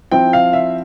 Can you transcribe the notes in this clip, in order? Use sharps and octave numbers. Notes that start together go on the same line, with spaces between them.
F3 C4 E4 G5
F5
E5